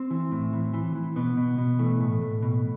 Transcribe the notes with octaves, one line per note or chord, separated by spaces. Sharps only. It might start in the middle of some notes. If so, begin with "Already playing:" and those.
Already playing: C4
E3
A2
E3
E3
E3
B2 B3
B2
B2
E3 A3
A2
A2
B2